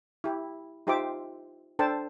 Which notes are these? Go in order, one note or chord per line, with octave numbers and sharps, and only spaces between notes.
E4 G4
D#4 F4 G4 C5 E5 D6
D4 A4 C5 G5 A5